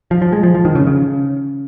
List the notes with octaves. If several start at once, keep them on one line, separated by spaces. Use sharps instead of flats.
F3
F3
G#3
F3
F3
D#3
C#3
C#3